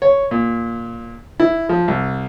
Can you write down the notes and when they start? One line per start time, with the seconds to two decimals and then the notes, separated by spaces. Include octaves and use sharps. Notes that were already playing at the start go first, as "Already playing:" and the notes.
0.02 C#5
0.31 A#2
1.40 E4
1.69 F3
1.88 C2